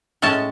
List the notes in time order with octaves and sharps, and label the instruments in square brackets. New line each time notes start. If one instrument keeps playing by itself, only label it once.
[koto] A2 G#3 C#4 A5